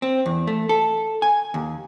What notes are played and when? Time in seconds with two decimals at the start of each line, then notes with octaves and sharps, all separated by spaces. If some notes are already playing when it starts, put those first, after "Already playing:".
0.02 C4
0.26 E2
0.47 A3
0.69 A4
1.22 G#5
1.54 D#2